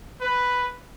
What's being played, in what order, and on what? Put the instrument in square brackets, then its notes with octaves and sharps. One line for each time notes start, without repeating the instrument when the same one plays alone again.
[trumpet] B4